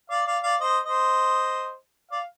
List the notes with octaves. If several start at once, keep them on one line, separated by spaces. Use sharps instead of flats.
D5 F5
D5 F5
D5 F5
C5 D#5
C5 D#5
D5 F5